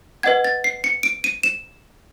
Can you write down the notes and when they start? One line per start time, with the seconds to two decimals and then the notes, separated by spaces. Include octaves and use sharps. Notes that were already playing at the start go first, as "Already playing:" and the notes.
0.23 B4 D#5 F#5 G#6
0.44 A6
0.64 C7
0.84 C#7
1.03 D7
1.24 D#7
1.43 E7